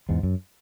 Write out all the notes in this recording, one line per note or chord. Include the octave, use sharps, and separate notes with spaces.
E2 G#2
F#2